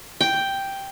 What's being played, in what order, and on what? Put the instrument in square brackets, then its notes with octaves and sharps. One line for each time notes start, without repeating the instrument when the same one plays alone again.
[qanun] G5